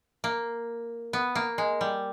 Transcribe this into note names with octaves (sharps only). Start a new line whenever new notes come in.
A#3
B3
A#3
G#3
G3